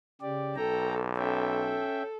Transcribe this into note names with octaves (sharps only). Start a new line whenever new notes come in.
C#3 G4 D5
B1 A4 G5 A#5
C#4 A4 E5 G5